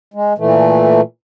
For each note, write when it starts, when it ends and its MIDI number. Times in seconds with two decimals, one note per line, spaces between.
0.14 0.33 56
0.38 1.01 46
0.38 1.01 52
0.38 1.01 57